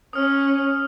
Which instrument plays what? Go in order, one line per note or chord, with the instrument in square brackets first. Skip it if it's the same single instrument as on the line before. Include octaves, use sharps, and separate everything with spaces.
[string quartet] C#4 [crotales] D#6 F6